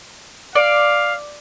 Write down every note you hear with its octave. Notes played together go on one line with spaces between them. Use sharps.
D5 F5